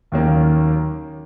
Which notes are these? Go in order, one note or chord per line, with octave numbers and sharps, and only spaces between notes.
D#2 D#3 F#3 A#3 C#4